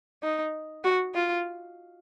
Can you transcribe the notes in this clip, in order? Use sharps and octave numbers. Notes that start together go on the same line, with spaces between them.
D#4
F#4
F4